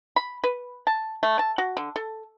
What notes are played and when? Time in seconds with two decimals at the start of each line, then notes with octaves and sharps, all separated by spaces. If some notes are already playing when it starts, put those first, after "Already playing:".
0.16 B5
0.44 B4
0.87 A5
1.23 A3
1.39 A5
1.58 F#4
1.77 D3
1.96 A4